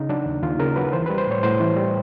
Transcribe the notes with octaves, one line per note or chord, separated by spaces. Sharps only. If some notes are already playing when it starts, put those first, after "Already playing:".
Already playing: C#3 D#4
F#3 D4
D#2
D#2 F4
C#3 A#4
F#3 B4
E3 C5
B4
G3
C5
A2 C#5
A2 C5
E3
G3